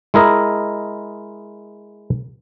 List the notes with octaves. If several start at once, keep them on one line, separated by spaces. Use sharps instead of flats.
G#3 E4 A#4 D#5